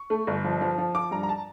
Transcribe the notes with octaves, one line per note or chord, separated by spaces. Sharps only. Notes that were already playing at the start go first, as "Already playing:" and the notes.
Already playing: C#6
A3
G1
F3
F3
F3
F3 D6
G2 A#5
A#5
A5